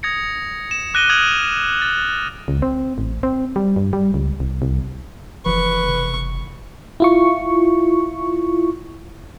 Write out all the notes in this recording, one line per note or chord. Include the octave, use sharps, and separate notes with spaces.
D#6 G#6 A#6 C#7
E7
D6 F#6 A#6 D#7 G7
D#6 F6 G#6 D7 F#7 G7
A6
C#2
C4
A1
C4
G3
G2
G3
C#2
C2
C2
F#1 E3 F3 B4 C#6
C3 E3
E4 F4 C#6